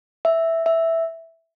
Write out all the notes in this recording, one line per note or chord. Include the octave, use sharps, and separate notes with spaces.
E5
E5